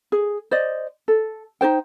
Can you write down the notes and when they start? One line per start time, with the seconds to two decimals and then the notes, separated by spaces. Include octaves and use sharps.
0.12 G#4
0.51 C5 D5 D#5
1.08 A4
1.61 D#4 F4 C5 G5